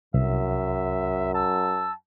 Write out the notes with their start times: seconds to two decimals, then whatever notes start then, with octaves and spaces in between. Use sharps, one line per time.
0.14 C2 F#2 E5
1.35 A5 E6